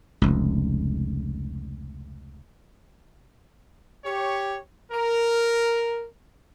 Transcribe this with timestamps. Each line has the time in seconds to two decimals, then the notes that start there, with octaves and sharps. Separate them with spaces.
0.22 F1 C#2
4.05 G4 C#5
4.92 A#4